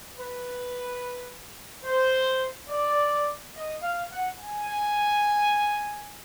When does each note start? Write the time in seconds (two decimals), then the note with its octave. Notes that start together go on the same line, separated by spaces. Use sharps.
0.16 B4
1.85 C5
2.70 D5
3.54 D#5
3.82 F5
4.11 F#5
4.39 G#5